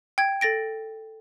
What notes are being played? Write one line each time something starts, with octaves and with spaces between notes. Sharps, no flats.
G5 G#6
A4 A6 A#6 D7